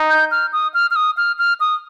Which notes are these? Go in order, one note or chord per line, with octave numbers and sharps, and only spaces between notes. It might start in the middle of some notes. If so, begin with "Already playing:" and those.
Already playing: D#4
G6
F6
D#6
F6
F6
D#6
F6
F6
D#6